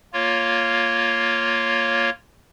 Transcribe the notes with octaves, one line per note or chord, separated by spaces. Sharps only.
A#3 F4 C#5